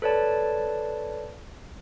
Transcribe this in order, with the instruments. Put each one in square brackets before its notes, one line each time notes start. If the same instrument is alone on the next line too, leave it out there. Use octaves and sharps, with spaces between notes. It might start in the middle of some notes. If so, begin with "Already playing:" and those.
[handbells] A4 B4 C#5 D5 A5